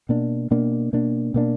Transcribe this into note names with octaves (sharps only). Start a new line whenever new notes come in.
B2 A#3 D4
B2 A#3 D4
B2 A#3 D4
B2 A#3 D4